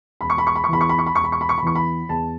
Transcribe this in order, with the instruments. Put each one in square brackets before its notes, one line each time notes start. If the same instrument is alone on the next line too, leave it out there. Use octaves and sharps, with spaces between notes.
[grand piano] E1 B5
C#6
B5
C#6
B5
C#6
E2 E3 B5
C#6
B5
C#6
B5
E1 C#6
B5
C#6
B5
C#6
B5
E2 E3 C#6
B5
E2 A5